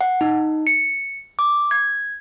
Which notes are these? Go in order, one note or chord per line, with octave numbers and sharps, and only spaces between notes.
F#5
D#4
C#7
D6
G#6